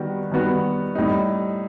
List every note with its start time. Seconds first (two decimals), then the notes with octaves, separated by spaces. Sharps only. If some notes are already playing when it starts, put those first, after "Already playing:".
Already playing: D#3 G3 B3 F#4
0.32 D#3 G3 B3 F#4
0.95 A2 G3 D#4